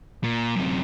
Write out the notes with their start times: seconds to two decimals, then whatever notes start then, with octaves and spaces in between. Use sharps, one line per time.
0.24 A#2
0.56 F#2 C3